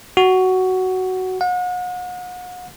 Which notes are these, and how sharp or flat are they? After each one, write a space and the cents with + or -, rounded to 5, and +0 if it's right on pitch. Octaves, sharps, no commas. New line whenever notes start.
F#4 +10
F#5 -40